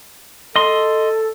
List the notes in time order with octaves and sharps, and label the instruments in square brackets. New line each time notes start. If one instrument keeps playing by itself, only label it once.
[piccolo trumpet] A4 [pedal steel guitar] D#5 C6